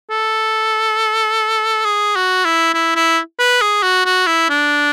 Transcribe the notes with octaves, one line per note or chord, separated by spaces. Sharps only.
A4
G#4
F#4
E4
E4
E4
B4
G#4
F#4
F#4
E4
D4